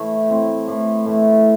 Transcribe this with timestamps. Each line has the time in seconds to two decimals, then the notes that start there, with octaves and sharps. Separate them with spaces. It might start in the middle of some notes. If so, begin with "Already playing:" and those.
Already playing: A2 E3 A3
0.30 A2 E3 C4
0.68 A2 E3
1.05 A2 E3 A3